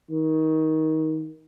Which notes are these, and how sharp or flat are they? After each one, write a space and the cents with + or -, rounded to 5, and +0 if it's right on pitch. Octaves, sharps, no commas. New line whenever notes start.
D#3 +20